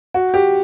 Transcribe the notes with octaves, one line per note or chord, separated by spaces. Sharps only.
F#4
G4